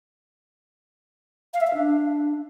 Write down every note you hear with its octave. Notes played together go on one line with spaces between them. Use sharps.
F5
E5
F5
D4